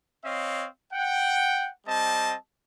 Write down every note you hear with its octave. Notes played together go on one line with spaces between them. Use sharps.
C4 C#5 D#5 F5
F#5 G5
G3 C4 D#5 A5